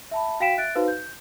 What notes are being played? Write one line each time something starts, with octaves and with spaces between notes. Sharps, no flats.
E5 A5 B5
F#4 F5 G5 B6 D7 E7
E5 F#6 A6 D7
D#4 F#4 B4 C5 F5
G6